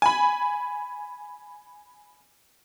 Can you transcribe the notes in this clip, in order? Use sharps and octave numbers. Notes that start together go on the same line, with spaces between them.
G#5 B5